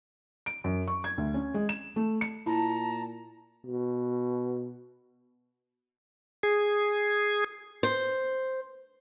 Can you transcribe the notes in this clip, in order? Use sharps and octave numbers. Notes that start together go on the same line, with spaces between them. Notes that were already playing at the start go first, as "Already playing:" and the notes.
D7
F#2
C#6
G#6
D2
C#4
G#3
E7
A3
C#7
A#2 E4 A5 A#5
B2
G#4
C5